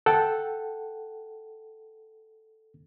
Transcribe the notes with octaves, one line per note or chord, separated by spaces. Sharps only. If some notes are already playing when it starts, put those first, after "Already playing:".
A4 F#5 G5